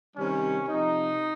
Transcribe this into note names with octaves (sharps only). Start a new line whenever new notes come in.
C3 D#3 G3 C#4
C3 F3 D#4